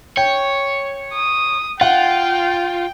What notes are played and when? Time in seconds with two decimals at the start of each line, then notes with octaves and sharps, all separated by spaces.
0.17 C#5 G5
1.13 D#6
1.81 F4 F#5 G5